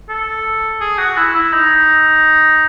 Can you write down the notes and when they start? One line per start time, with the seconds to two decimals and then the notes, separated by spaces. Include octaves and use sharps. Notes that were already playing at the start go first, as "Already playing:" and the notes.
0.09 A4
0.81 G#4
0.98 F#4
1.17 E4
1.35 E4
1.53 D#4